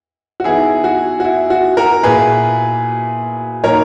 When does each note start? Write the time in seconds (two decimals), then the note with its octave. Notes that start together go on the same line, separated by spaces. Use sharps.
0.40 F#4
0.44 E3 B3 D#4 E4 G#4
0.84 F#4
1.20 F#4
1.24 E4
1.50 F#4
1.77 F#4 A#4
2.03 A#2 A#3 E4 G#4 B4
3.64 A#2 F#3 A#3 D#4 A#4 C#5